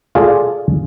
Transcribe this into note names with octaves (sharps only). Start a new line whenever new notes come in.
F4 G#4 A4 D5